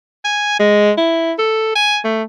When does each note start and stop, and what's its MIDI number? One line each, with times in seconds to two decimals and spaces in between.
0.25 0.57 80
0.59 0.91 56
0.97 1.33 64
1.38 1.71 69
1.76 1.98 80
2.04 2.23 57